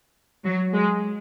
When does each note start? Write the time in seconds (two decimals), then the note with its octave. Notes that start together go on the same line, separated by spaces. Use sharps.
0.44 F#3
0.74 G#3